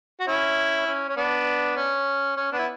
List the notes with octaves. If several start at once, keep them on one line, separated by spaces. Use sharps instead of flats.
F#4
C#4 E4
C#4
C#4
B3 D4
C#4
C#4
B3 D4
E4